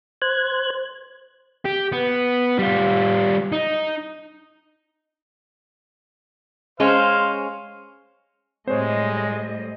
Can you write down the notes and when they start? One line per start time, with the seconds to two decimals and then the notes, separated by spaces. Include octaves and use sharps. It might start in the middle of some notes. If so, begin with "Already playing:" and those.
0.22 C5 F#6 G#6
1.65 G4
1.92 B3
2.59 G3 F4
3.52 D#4
6.80 G#3 C#4 C5 F5
8.68 A2 G3 G#3 C4 C5 C#5 D#5